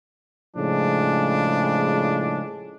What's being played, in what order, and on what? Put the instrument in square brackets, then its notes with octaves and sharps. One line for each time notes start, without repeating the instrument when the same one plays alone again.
[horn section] A2 C#3 F3 G#3 D4